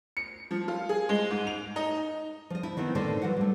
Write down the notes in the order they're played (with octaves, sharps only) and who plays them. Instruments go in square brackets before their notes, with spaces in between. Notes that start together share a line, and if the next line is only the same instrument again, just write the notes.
[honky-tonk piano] C#7
F3
F4
G#4
G#3
G#2
F7
D#4
[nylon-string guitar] F3 D#5
E4
D#3 B3 C4 D#4
A2 D3 D#3 C5 D5 D#5
E3 F#3 F4 F#5
G3 A3